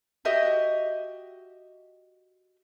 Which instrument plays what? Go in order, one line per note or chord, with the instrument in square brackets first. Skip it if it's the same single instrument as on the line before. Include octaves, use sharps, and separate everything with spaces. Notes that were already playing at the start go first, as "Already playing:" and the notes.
[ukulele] F#4 G4 D#5 E5